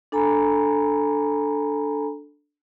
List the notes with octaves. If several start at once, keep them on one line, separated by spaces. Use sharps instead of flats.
D4 A4 G#5 A#5 B5